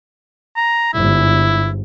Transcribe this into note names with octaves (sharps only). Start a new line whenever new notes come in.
A#5
G1 G#2 E4